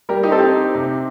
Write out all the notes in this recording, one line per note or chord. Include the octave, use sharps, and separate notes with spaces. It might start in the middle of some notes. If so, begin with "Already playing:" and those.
G3 G4 A#4
D#4 G4
C4 A4
D#4 G4
C4
C3